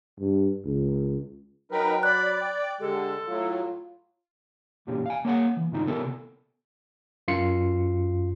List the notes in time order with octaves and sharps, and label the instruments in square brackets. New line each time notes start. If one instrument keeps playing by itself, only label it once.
[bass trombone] G2
C#2
[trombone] F#3 [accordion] D#4 A#4 B4 [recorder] G5
[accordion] D5 [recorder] B5 [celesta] F#6
[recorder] G5
[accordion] D3 G#3 [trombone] G4 [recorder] A4
[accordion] A2 F#3 [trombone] F4
[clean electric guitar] B1 E2 A#2 C#4 G4
F5 G#5
A#3 C#5 F#5
E3
G#2 C3 E3 D#4 F4
C3 B3 A4 A#4
[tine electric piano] F#2 F4 C7 C#7